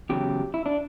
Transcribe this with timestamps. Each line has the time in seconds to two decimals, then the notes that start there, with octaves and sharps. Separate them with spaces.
0.09 E2 C#3 F#3 G4
0.54 E4
0.66 D4